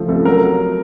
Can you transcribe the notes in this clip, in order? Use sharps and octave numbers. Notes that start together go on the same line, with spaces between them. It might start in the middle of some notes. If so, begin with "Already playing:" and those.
Already playing: C#3 F3 A3
C2 A4
F#3 A#4